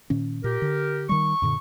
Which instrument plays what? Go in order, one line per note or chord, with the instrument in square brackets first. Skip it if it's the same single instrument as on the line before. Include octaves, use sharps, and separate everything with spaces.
[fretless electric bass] A#2 D#3 C#4
[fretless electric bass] A#2 [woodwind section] G4 A#4
[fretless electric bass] D3
[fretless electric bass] D#3 G3 [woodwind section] C#6
[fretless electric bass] F#2 A#2 D3